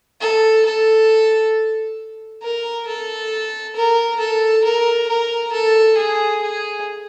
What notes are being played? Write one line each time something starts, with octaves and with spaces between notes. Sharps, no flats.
A4
A4
A#4
A4
A#4
A4
A#4
A#4
A4
G#4
G#4